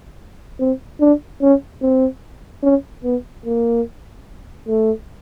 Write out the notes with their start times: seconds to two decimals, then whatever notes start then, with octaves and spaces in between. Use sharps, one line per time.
0.60 C4
1.00 D4
1.42 C#4
1.82 C4
2.63 C#4
3.04 B3
3.45 A#3
4.67 A3